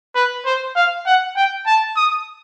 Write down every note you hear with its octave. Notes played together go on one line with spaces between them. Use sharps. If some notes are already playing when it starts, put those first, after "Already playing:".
B4
C5
F5
F#5
G5
A5
D#6